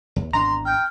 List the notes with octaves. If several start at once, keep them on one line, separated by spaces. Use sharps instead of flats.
D#2
G#1 E2 D4 A#5 C6
G5 F6 G6